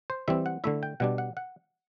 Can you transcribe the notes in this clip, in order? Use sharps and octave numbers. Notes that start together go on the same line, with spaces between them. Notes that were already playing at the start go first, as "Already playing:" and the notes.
C5
E3 G3 C4 E5
F#5
D3 A3 E4 E5
G5
B2 G3 D4 F#5
F#5
F#5